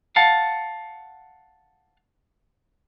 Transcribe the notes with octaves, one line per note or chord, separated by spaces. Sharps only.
F5 F#5 A5